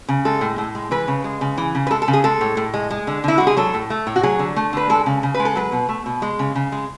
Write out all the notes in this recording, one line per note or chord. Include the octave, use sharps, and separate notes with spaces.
C#3
G#3 A4
A2
A2
G#3
E3 B4
C#3
G#3
C#3
E3
C#3
B4
G#3 A4
A4
C#3
G#4
G#3 A4
A2
A2
G#3
G#3
D3
D3 E4
G#3 F#4
G#4
F#3 A4
A2
A3
A2
F#4
F#3 G#4
D3
A3
D3 B4
G#3 A4
C#3
C#3
B4
G#3
A4
F#3 B4
B2
A3
B2
G#3
C#3
C#3
G#3